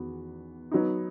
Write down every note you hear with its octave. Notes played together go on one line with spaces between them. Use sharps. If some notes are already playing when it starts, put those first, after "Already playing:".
Already playing: E2 D#3 B3 F#4
F#3 B3 D#4